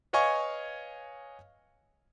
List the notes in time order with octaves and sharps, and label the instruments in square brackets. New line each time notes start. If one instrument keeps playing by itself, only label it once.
[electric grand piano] B4 C#5 D#5 F5 G#5 C#6